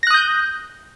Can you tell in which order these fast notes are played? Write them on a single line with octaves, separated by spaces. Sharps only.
A#6 F#6 D#6 G6